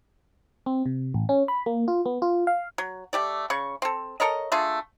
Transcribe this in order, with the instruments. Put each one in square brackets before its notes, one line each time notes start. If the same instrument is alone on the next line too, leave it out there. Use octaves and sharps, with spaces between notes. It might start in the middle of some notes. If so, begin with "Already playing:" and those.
[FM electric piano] C4
C3
A1
C#4
B5
A#3
F4
B3
F4
F5
[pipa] F#3
A3 G4 D5
C#3 C#6
C4 A4
A4 A#4 C#5 D#5
A3 D4 F4 G#4